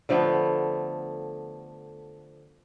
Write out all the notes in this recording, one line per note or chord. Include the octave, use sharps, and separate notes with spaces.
D3 F3 A3 B3